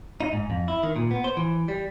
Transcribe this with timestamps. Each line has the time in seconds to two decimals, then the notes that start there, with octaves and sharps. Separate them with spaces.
0.21 D#4
0.33 G#2
0.50 F2
0.68 E4
0.83 D#3
0.96 A#2
1.11 B3
1.24 C5
1.37 E3
1.68 G3